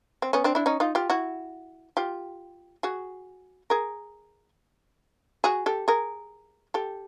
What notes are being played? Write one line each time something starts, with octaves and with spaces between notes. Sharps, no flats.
C4
B3 C#4
C4 D4
D4 E4
C#4 D#4
D#4 F4
F4 G4
E4 F#4
F4 G4
F#4 G#4
G#4 A#4
F#4 G#4
G4 A4
G#4 A#4
G4 A4